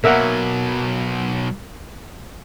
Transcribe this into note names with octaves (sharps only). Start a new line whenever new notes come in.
B2 F#3 A#3 E5 F#5